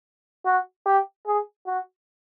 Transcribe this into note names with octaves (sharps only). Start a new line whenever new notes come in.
F#4
G4
G#4
F#4